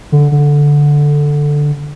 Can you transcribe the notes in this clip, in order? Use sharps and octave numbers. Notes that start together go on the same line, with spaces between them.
D3
D3